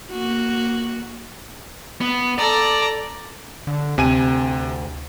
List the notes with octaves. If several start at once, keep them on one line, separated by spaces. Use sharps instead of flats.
A#3 F#4
B3
A4 D5 A#5
D3
D2 C3 G#5 D#7